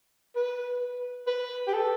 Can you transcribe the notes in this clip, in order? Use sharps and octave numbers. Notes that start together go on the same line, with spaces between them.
B4
B4
G4
A4